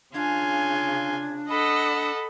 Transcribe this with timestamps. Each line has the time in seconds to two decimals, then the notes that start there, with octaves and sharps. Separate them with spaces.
0.14 C#3 D4 F4 G#5 G#6
1.50 A4 D#5 F#5 B5 E6